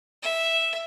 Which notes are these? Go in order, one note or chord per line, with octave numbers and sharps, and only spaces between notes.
E5